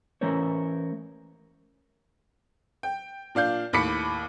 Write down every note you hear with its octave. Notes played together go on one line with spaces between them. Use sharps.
E3 A3 C#4 A#4 C5 C#5
G5
A#2 D4 F5 G6
D#2 A2 B5 D6 B6 C#7